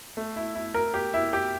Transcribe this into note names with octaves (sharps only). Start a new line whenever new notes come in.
A3
E4
E4
A#4
G4
E4
G4